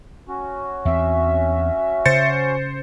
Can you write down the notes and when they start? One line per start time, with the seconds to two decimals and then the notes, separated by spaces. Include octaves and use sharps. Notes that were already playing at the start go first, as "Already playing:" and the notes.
0.28 C#4 F#4
0.85 E2 C4 E5
2.06 C#3 C5 A6 C#7